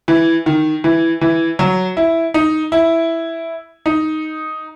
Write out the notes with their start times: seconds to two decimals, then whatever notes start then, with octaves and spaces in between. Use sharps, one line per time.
0.08 E3
0.46 D#3
0.84 E3
1.21 E3
1.59 F#3
1.97 E4
2.34 D#4
2.72 E4
3.86 D#4